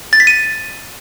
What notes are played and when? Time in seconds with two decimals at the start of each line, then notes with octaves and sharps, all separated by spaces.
0.13 A6
0.20 B6
0.27 D#7